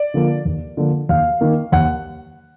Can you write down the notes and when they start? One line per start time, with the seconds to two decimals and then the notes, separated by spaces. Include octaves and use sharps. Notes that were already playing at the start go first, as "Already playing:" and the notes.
Already playing: D5
0.14 D3 F3 A#3
0.45 D#2
0.77 D3 F3 A#3
1.09 D#2 F5
1.41 D#3 A#3
1.72 D#2 F#5